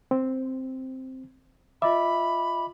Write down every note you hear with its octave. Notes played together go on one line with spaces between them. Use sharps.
C4
F4 D#5 E5 B5 D6